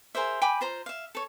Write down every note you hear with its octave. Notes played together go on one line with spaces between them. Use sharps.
G#4 A#4 C5 E5
G5 G#5 B5 D6
F4 C5 A#5
E5 F5
A4 C#5